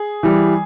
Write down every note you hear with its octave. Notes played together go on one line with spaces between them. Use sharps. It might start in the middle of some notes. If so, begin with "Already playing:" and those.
Already playing: G#4
E3 G3